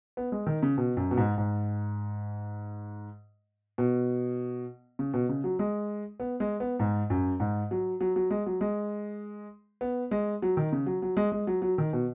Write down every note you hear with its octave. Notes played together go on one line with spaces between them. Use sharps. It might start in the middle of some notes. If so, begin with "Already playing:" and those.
B3
G#3
D#3
C#3
B2
F#2
B2
G#2
G#2
B2
C#3
B2
C#3
F#3
G#3
B3
G#3
B3
G#2
F#2
G#2
F#3
F#3
F#3
G#3
F#3
G#3
B3
G#3
F#3
D#3
C#3
F#3
F#3
G#3
G#3
F#3
F#3
D#3
B2